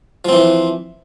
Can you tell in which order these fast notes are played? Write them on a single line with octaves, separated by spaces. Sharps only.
F3 C4 E3